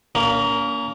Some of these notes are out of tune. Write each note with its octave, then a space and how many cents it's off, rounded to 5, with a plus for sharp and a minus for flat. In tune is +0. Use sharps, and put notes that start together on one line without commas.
A#3 +0 C#4 +40